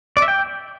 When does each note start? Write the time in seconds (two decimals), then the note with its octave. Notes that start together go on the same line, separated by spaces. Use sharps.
0.17 D5
0.22 E5
0.28 G5